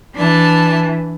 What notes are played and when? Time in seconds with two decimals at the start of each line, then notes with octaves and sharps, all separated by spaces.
0.15 E3 D4 A5